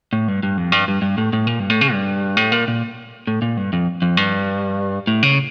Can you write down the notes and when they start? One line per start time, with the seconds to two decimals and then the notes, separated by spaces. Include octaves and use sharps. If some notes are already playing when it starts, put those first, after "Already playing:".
0.13 A2
0.28 G2
0.43 G2
0.58 F2
0.72 G2
0.88 G2
1.02 G2
1.18 A2
1.33 A2
1.47 A#2
1.59 G2
1.70 A2
1.81 C#3
1.93 G2
2.37 A2
2.52 A#2
2.68 A#2
3.27 A2
3.42 A#2
3.57 G2
3.73 F2
4.02 F2
4.17 G2
5.07 A2
5.23 C#3